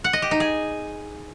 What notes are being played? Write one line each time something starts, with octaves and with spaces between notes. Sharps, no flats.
F#5
D#5
G4
D#4
G#4